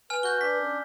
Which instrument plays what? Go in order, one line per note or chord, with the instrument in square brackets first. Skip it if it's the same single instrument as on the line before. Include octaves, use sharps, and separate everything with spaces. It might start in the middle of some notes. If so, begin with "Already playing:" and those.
[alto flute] B4 [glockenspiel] G#5 F6
[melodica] F#4 [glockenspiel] G6 G7
[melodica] D4 [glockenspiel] B6
[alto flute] C#4